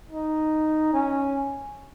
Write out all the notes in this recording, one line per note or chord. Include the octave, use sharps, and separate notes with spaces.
D#4
C#4